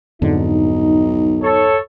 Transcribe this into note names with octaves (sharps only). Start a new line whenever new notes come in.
B1 F2 G#2 D3 D#4
A4 C#5